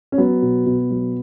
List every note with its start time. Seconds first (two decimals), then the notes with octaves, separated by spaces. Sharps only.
0.12 C#4
0.18 F#3 B3
0.42 B2
0.66 B2
0.91 F#3